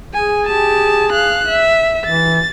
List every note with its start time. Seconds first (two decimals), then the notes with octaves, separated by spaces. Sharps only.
0.14 G#4 G#5
0.46 G4 A5
1.13 F5 F#6
1.49 E5
2.05 E3 A6